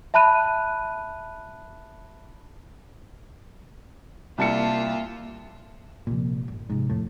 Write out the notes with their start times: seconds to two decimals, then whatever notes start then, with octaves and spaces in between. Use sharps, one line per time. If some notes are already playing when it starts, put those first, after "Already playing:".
0.14 E5 A5 B5 F#6 D#7
4.38 C2 A#3 F4 E5 A5 C#7
6.07 C2 A#2 F3
6.48 G1 D#2
6.70 G#2 C3 F3
6.90 F2 A2 F3